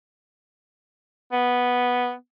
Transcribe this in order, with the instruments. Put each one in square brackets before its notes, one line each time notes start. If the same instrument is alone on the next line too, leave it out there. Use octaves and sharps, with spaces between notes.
[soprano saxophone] B3